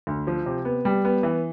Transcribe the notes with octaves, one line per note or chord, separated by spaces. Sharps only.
D2
F3
C3
B3
G3
B3
E3